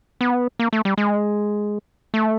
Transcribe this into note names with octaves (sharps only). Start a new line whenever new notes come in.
B3
A#3
A3
G3
G#3
A3